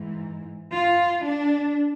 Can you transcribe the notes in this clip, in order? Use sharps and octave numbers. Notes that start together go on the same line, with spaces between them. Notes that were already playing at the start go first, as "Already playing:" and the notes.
Already playing: G#2 E3
F4
D4